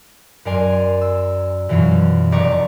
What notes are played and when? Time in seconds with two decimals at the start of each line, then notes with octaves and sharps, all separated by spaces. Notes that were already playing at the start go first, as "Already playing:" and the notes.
0.45 F#2 A#4 D5 G#5 C6
1.01 E6
1.69 F#2 B2 E3 F#3 F4
2.32 F1 D5 A#5 C#6 D6 A#6